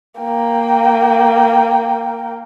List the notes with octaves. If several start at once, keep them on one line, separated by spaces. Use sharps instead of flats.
A#3 G5